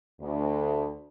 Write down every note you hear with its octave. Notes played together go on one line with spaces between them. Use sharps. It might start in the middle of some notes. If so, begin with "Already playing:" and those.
D2